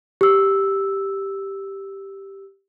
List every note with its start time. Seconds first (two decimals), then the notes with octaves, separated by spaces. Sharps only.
0.21 G4 E6